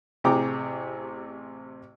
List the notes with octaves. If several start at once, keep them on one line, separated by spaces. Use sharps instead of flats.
A1 C3 G#4 G5 A#5 D6